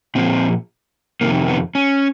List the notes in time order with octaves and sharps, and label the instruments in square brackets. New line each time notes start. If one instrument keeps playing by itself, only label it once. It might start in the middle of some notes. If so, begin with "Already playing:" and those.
[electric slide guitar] A#2 F3 C4
F2 C3 D#3 A#3
B3
C#4